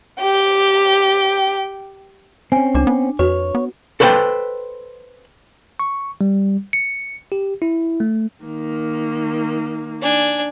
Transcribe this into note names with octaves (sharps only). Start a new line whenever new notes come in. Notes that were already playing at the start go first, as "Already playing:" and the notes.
G4 G5
C4 C#4 G#5
C#2 D4 D6
B3
F2 F#4 B4 C#5
B3
A4 B4 C5 D5 G5
C#6
G3
C#7
G4
E4
A3
D#3 A#3
D4 G#5